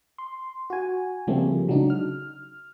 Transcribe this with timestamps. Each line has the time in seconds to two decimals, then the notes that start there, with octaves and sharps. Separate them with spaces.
0.18 C6
0.70 F#4 G#5
1.27 C#3 F3 G3 A3 A#3 C4
1.68 C#3 F#3 G#3 D4 D#4
1.90 F6